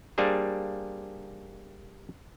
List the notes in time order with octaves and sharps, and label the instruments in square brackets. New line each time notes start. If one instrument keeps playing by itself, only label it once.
[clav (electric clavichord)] G3 A#3 D4 G#4 C5